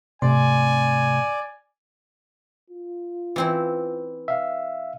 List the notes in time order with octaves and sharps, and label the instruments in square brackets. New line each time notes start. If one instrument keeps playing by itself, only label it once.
[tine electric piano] G#2 A3 C6 [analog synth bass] C3 [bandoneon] D5 [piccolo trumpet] G#5
[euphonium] F4
[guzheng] E3 C4 E4
[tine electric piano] E5 F5